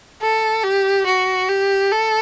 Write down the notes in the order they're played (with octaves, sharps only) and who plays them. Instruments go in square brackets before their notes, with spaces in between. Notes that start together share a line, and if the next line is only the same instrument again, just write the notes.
[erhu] A4
G4
F#4
G4
A4